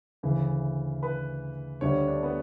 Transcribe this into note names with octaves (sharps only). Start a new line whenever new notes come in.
D2 C#3 E3
B4
D2 D3 G3 C#5
D4
B3